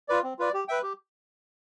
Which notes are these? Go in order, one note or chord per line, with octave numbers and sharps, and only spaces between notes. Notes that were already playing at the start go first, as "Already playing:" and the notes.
F4 B4 D5
C4
F4 B4 D5
G4
B4 E5 G5
G4